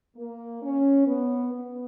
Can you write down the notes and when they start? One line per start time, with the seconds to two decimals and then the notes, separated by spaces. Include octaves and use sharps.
0.16 A#3
0.62 C#4
1.07 B3
1.53 B3